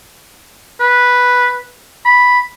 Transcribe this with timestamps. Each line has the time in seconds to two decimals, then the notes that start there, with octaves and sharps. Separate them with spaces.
0.80 B4
2.05 B5